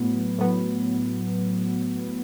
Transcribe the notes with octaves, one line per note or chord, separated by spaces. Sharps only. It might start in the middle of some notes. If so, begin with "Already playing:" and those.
Already playing: A2 F#3 B3
A2 F#3 B3